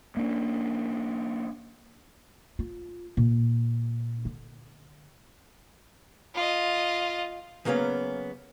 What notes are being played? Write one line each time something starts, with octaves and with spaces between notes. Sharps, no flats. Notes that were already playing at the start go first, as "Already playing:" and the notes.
A#3 C#4 D4
F4
A#2
D3
F4 D#5
C#3 F#3 A#3 B3 C#4